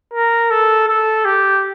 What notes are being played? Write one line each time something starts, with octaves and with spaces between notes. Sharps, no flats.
A#4
A4
A4
G4